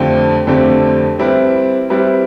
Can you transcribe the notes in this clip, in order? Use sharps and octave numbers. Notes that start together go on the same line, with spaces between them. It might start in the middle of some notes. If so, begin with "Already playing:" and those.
Already playing: F2 D3 A3 C4 G4
F2 D3 A3 C4 G4
G3 C4 E4 B4
G3 C4 E4 B4